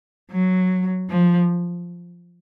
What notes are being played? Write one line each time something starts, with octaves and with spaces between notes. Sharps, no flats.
F#3
F3